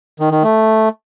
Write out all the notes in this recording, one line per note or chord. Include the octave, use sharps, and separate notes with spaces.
D#3
D#3
A3